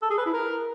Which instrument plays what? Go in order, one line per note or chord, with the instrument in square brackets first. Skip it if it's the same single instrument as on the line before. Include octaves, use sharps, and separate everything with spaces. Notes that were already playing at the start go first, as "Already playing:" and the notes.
[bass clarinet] A4
G#4
B4
E4
A#4